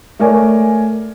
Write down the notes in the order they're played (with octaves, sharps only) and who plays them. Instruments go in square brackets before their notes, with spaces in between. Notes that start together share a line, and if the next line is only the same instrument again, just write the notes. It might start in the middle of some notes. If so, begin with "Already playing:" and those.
[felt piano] A3 A#4 C#5 D5 G#5